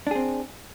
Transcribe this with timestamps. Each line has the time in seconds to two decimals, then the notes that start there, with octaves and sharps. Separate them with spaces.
0.07 D4
0.11 G#4
0.15 C4